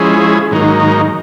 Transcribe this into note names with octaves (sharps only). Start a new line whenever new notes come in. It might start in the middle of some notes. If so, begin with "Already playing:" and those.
Already playing: F3 G#3 C#4 E4 G#4
G#2 D#3 F#3 A#3 D#4